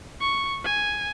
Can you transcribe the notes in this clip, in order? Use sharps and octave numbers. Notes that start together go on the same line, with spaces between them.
C#6
G#5